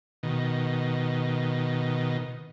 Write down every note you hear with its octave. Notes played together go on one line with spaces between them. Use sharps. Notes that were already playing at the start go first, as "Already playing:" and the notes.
B2 D#3